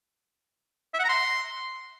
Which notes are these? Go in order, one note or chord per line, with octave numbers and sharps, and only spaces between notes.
E5
F#5
A#5
C6